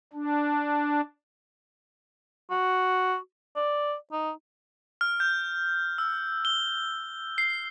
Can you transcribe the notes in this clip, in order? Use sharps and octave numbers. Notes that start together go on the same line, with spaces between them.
D4
F#4
D5
D#4
F6
G6
E6
G7
C7